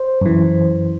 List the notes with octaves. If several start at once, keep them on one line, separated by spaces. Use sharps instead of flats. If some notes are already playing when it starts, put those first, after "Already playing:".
Already playing: C5
F#2 E3